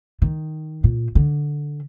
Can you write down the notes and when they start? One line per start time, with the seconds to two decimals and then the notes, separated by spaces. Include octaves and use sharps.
0.22 D#3
0.84 A#2
1.15 D3